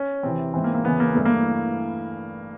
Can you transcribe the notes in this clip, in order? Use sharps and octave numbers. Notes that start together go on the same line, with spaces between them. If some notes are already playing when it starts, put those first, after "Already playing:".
Already playing: C#4
E2 C3 E3 C4
G#2 E3 C4
A#3
A#3
E2 C#3 E3 B3
A#3
G2 E3 A3
A#3